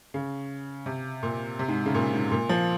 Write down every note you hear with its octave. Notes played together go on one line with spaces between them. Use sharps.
C#3
C3
A#2
C3
G#2
C#3
A#2
G#2
A#2
F3